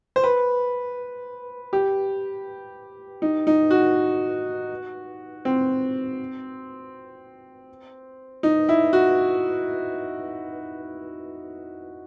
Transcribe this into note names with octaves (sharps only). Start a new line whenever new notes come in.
C5
B4
G4
D#4
D#4
F#4
C4
D#4
E4
F#4